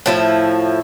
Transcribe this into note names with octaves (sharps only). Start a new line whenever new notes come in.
A2 F3 E4